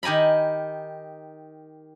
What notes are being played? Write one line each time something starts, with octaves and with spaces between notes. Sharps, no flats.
D#3 G4 G#5 A#5 B5